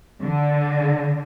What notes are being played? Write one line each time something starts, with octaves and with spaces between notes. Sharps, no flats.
D3